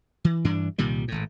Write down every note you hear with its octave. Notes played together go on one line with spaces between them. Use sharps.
E3
G2 E3 D4
C2 A#2 D#3 G3
G#1 A2